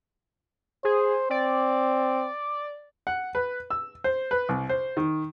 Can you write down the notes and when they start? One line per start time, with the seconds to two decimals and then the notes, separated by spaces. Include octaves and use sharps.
0.85 G#4 C5
1.30 C4 D5
3.07 F#5
3.35 B4
3.70 E6
4.04 C5
4.31 B4
4.49 C2
4.69 C5
4.97 D#3